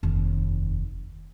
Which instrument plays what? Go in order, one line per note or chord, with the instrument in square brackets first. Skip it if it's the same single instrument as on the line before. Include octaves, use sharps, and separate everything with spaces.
[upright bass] F1 D#2